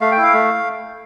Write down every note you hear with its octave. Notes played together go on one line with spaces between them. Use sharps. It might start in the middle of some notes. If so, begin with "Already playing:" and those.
A3 F5
G5
E4
F5
A3